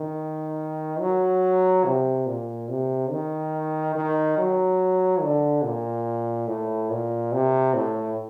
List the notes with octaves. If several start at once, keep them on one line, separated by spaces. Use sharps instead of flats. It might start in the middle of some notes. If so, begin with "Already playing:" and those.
Already playing: D#3
F#3
C3
A#2
C3
D#3
D#3
F#3
D3
A#2
A2
A#2
C3
A2